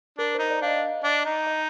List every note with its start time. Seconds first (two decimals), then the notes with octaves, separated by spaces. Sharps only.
0.18 D4 A#4
0.35 D#4 C5
0.50 D5
0.62 D4 F5
0.67 D#5
1.04 D4
1.26 D#4
1.47 D#5